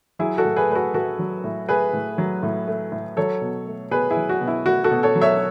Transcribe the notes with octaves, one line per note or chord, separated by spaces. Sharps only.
F#3 E4 G#4
F#4 A4
A2
G#4 B4
A3 B4
F#4 A4
A2 F#4 A4
F#3
A2
A3 G#4 B4
A2
F#3
A2
A3
A2
F#3 A4 C#5
B2
A3
B2 G#4 B4
E4 G#4
F#3
F#4
B2
E4
A3 F#4
F#4 A4
B2
A4 C#5
F#3
C#5 E5